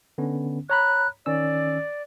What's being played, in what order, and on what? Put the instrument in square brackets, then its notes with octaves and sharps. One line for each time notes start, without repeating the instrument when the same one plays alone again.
[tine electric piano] D3 B3 C#4
[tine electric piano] C#5 A#5 B5 [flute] F#6
[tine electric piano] D#3 C#4 E6 [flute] D5